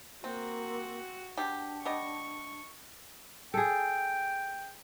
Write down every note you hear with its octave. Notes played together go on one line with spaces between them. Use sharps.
A#3 C4 F#4
B2 D4 G4
B3 G4 D#5 C#6
G#4 A4 G5